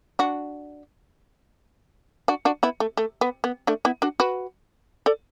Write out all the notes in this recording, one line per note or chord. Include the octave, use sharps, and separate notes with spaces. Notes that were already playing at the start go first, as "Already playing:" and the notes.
D4 F#4
D4 F#4
D4 F#4
B3 E4
A3
A3
B3
B3
A3 D4
B3 E4
D4 F#4
F#4 B4
A4 D5